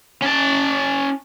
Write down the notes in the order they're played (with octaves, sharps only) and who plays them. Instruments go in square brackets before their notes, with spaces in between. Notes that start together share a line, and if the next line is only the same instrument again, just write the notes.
[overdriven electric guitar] C#4 A5